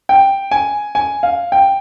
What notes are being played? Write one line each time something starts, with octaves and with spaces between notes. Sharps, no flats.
G5
G#5
G#5
F5
G5